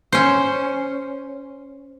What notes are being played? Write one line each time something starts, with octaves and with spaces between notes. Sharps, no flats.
C#4 C5